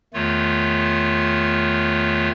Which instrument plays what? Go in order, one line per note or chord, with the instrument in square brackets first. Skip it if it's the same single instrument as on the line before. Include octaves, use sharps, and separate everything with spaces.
[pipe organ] E2 D#3 A3 F4 C#5